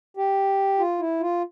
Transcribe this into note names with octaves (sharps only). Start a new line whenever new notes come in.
G4
F4
E4
F4